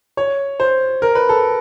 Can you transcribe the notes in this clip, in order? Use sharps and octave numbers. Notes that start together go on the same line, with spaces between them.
C#5
C5
A#4
B4
A4